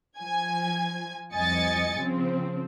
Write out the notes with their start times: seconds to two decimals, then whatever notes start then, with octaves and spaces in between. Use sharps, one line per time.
0.19 F3 G#5 G#6
1.33 C2 F2 D#5 G#5 A6 C#7
1.99 C#3 F3 C4